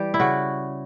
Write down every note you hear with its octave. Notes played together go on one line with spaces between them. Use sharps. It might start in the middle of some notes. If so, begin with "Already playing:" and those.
Already playing: E3 G3 G4
E4
C#3 F#4